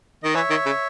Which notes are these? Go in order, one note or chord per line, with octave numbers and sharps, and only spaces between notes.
D#3 D#5
E3 C#5 E5
D#3
C#3